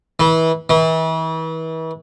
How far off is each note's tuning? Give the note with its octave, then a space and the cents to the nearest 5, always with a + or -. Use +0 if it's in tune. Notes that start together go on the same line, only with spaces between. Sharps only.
E3 -25
E3 -35